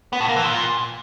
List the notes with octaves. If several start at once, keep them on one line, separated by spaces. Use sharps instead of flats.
B3
A2
A#3
E3
A#2